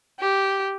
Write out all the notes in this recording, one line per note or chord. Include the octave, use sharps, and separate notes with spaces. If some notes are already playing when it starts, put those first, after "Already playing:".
G4